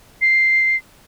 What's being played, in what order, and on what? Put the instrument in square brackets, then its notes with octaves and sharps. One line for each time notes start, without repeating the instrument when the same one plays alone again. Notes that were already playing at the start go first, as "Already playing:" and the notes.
[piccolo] C7